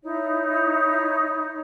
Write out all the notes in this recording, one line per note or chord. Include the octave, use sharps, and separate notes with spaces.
D#4 E4 C#5